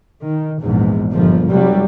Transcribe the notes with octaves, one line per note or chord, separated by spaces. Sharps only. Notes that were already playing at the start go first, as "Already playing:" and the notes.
D#3
A#1 E2 G#2
G1 A#2 F3
F1 F#3 G3